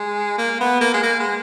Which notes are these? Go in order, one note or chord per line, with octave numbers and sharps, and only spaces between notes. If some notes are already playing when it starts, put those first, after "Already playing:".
Already playing: G#3
A#3
B3
A#3
G#3
A#3
G#3